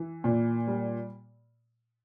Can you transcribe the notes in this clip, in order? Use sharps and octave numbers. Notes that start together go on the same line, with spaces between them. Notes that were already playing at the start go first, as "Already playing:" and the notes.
Already playing: E3
A#2
G3